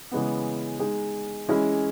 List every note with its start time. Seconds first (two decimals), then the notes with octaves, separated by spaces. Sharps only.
0.12 C#3 E3 G#3 B3
0.79 G#3 D#4 G#4
1.48 E3 G#3 C#4 E4 G#4